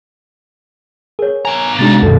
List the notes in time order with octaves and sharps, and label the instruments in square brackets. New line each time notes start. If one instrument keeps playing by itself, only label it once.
[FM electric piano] G#4 [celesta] A#4 C#5
[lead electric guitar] B3 A#5 [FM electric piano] G#5
[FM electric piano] C3 G#3 D4 [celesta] D#4 F#4 A6
[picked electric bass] F#2 B2 D#3 [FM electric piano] A4